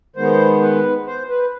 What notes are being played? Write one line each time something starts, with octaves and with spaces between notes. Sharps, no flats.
D#3 G#3 B3 C5
B4
C5
B4